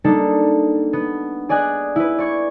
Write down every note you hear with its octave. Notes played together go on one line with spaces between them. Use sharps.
G3 A#3 D4 D#4 A4
B3
G#4 D5 D#5 G#5 F#6
E4 B4
D5 C#6 G#6